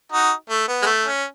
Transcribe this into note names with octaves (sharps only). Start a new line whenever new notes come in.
D#4 F#4
A3
B3
G#3
A3
C#4